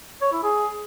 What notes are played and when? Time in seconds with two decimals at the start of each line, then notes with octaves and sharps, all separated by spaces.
0.21 C#5
0.32 E4
0.43 G#4